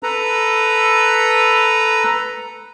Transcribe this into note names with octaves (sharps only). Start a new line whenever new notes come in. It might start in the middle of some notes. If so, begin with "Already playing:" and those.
A4 B4 A#5